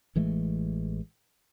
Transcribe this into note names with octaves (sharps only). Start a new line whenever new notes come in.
A1 E3 G#3 A3